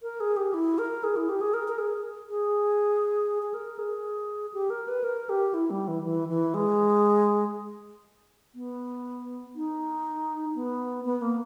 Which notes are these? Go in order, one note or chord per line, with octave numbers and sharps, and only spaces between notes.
A#4
G#4
G4
E4
A#4
G#4
E4
G4
G#4
A#4
A#4
G#4
G#4
G#4
A#4
G#4
G4
A#4
B4
A#4
G4
E4
G3
E3
E3
E3
G#3
B3
D#4
B3
B3
A#3